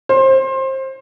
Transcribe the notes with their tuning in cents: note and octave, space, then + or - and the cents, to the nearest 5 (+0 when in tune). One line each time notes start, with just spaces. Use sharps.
C5 +25